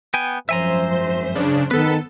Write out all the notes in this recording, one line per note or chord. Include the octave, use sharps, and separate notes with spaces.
B3 G5 G#5
G#1 F#2 F3 C5 E5 G#5 A#5
C#3 D4
D#3 B3 A4 B4